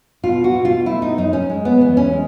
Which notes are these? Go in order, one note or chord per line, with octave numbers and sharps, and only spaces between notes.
B2 F4
F#4
B2
F4
A3 E4
D#4
F#2 D#4
C#4
G#3
B3
E2 B3
C#4
G#3